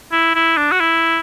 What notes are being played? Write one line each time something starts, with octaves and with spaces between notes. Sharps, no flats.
E4
E4
D4
F#4
E4